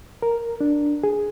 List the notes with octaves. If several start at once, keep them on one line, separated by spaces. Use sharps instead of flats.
A#4
D4
G#4